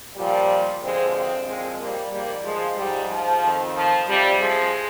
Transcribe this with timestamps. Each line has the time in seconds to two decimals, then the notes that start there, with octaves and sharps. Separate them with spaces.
0.16 A#2 F3 G3
0.82 G2 D3 F3 G#3 C4
1.15 G#3 C4
1.46 A#2 F3 G#3 C4
1.79 G3 A#3
2.11 G#2 F3 G3 A#3
2.44 F3 G#3
2.77 G#2 F3 G3
3.09 F3
3.42 F2 D#3
3.75 F3
4.07 F2 C3 F3 G3
4.40 F3 G#3